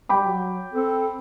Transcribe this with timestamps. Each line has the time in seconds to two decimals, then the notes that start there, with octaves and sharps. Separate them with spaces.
0.09 G3 G5 B5 D6
0.25 F#3
0.73 C4 A4